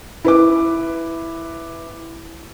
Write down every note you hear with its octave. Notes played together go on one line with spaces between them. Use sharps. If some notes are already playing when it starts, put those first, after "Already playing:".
E4 B4 D6